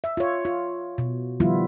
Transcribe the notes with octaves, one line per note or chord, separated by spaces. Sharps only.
E5
F4 C#5
F4
B2
D#3 F3 G3 B3 E4 F4